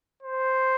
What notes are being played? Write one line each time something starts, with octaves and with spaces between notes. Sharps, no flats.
C5